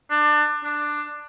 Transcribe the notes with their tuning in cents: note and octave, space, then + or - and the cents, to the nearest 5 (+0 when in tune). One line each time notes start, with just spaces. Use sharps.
D4 +25
D4 +10